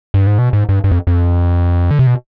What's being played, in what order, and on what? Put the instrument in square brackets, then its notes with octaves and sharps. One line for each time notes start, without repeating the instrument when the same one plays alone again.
[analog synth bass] G2
G#2
B2
G#2
G2
G2
F2
F2
D3
C3
B2